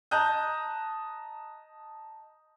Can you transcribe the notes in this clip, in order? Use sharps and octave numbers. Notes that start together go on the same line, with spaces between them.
D#5 A5 A#5 D#6 F#6 G6